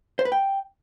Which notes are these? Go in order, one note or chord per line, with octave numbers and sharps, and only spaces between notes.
C5
B4
G5